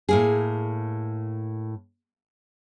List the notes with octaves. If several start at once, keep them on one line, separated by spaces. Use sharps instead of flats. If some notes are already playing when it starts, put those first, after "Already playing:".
A2 A#3 G#4